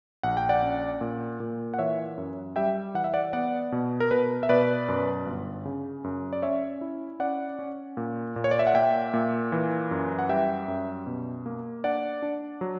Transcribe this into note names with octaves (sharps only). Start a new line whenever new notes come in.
A#1 F#5
G5
D5 F#5
C#4
A#2
A#2
F#5
E3 C#5 E5
F#2
G3 E5 G5
E3 F#5
E5
D5 F#5
B3 D5 F#5
B2
A#4
B2 B4
E5
B2 B4 D5
F#2
G1
C#3
F#2
D5
C#4 C#5 E5
E4
C#4 D5 F#5
C#4
A#2
A#2
C#5
D5
E5
F#5
A#3 E5 G5
A#2
E3
F#2
F#5
G3 E5 G5
F#2
B2
A#3
D4 D5 F#5
D4
F#3